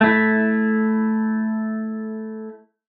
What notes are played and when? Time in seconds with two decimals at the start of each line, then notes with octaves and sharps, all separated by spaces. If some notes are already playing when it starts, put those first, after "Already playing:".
0.01 A3 E4